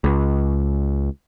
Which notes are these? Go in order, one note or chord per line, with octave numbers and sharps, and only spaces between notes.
C#2